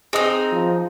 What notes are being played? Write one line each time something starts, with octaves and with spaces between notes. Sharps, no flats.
C4 D#4 G#4 D#5 D#6
F3